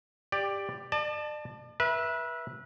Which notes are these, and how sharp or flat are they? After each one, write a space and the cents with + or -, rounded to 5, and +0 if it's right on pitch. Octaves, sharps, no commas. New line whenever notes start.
G4 +15 D5 +10
D5 +40 A5 +0
B4 -30 E5 +0